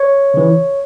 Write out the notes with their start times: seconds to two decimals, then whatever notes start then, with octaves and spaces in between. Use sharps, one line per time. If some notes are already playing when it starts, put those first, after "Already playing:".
Already playing: C#5
0.34 C#3 E3